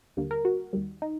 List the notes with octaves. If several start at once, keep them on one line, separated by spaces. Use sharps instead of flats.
D#2 D3 G3 A#3
A#4
F#4
D#2 D#3 G3
D#4